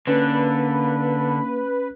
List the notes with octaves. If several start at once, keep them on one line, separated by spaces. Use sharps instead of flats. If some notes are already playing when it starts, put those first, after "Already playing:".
D3 A#3 C#4 B4